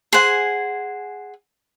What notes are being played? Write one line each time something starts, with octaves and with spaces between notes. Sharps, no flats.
G#4 C5 F#5 G#5